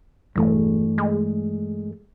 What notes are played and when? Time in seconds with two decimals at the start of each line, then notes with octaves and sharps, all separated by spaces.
0.36 E1 G2 E3 A3
0.98 G#3